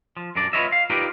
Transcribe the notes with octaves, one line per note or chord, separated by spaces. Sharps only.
F3
F#2 D4 A#4 D5
F4 G#4 B4 C#5 D#5 E5
F5
D#4 F4 G4 A#4 B4 D5